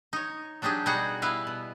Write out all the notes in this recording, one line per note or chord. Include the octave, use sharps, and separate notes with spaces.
D#4 C#5
F#3 D4 D#4 G4 G#4
B2 G3 D#4 F#4 G#4 F#5
B3 E4 B4 F5
B2